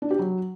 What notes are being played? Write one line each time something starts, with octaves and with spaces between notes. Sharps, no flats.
D4
G4
F#3